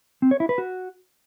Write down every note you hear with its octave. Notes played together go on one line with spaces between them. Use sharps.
C4
C#5
E4
B4
F#4